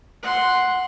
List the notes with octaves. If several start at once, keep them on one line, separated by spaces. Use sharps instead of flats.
F#5 C6